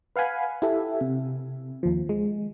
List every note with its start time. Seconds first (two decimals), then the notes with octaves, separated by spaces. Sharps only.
0.16 B4 F5 F#5 G#5 B5
0.62 E4 G4 A4 E5
1.01 C3
1.83 D#2 F3
2.09 G#3